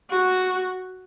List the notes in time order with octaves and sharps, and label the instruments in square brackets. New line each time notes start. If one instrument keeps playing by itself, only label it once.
[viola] F#4